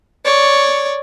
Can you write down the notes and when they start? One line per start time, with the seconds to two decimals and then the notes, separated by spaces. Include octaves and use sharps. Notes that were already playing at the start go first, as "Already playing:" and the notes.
0.25 C#5 D5